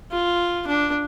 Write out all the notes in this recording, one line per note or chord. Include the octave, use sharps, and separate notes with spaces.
F4
D4